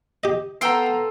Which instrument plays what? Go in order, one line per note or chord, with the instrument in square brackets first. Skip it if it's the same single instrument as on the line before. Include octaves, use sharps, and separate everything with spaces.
[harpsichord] G4 D#5
[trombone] B3 [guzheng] F4 A4 G5 [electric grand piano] A#5 E6 C7